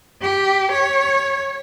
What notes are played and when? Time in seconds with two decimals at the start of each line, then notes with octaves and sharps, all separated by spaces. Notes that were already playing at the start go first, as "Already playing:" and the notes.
0.21 G4
0.72 C#5